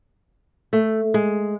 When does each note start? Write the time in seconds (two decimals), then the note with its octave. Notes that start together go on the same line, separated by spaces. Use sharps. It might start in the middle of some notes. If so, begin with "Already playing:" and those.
0.73 A3
1.14 G#3